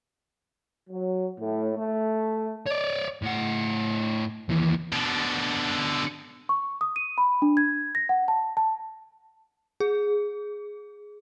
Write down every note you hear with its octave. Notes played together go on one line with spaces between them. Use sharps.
F#3
A2
A3
C#5 D5
A2 F#5
D#2 E3
B2 D3
C#6
D#6
D#7
B5
D4
G#6
A#6
F#5
A5
A5
G#4